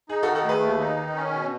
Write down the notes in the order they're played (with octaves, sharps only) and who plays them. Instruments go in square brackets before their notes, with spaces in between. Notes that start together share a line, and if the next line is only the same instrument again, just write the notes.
[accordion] D#4 [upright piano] G#4
[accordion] D#3 [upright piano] F#4 A4
[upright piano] F#4 A4
[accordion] A3 [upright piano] G#4 B4
[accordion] D#2
D#4
D#3
C#4
B2